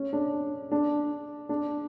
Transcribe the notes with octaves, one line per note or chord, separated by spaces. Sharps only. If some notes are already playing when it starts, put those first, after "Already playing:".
Already playing: C#4
D4
D4
D4